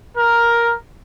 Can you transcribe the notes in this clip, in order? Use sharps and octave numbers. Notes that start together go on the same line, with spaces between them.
A#4